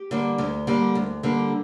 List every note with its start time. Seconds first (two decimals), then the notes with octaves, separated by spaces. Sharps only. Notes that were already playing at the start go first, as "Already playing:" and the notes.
Already playing: G4
0.11 D3 G3 A#3
0.38 D2
0.67 D3 G3 A#3
0.95 D2
1.23 D3 G3 A#3